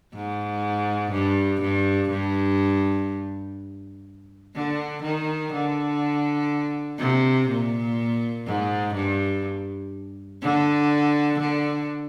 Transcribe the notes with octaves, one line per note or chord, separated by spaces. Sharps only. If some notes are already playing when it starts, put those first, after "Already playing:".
G#2
G2
G2
G2
D3
D#3
D3
C3
A#2
G#2
G2
D3
D3